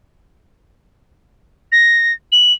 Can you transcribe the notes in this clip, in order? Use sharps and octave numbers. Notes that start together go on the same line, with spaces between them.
A#6
F#7